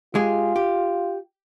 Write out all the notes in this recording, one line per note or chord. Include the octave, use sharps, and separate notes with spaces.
G#3 F4 G4 G#4
G4